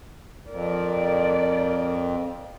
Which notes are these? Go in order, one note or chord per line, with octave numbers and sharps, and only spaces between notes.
F2 A#4 D5